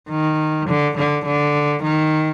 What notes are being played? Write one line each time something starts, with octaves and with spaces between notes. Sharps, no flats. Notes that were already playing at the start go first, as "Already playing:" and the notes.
D#3
D3
D3
D3
D#3